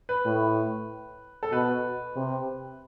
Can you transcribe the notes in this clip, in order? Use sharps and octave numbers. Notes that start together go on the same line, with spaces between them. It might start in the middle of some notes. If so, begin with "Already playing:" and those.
B4
A2
A4
B2 B4
C3